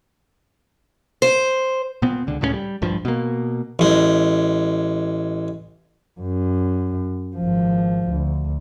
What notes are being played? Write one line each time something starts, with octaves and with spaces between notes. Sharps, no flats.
C5
A#2 B3 C4
C#2 D3
C#2 A2 G3 C#4
G3
A#1 G2 F3
B2 A#3
A1 G#3
F#2
G#1 F3
D2